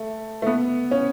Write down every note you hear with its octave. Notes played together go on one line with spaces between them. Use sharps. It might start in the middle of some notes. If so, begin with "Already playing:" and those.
Already playing: A3
A3
B3
C#4